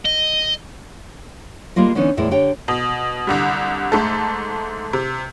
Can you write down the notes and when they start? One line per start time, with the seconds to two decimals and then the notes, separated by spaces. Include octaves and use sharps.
0.06 D#5
1.76 G3 G#3 A#3 F4 D#5
1.95 D3 E3 B3 C#4 D#4
2.17 E2 A2 G#3 E4 D5
2.31 D3 G4 C#5 G5
2.68 B2
3.27 C2 D3 G3
3.92 G#2 A3 A4
4.93 C3